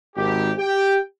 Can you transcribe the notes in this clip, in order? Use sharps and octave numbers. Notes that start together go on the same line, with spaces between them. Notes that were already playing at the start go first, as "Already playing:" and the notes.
G#1 G4
G4 G5